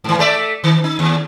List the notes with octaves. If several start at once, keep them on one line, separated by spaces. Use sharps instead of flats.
G#2 E3
A3 D5 E5
D#3
D#4
D#2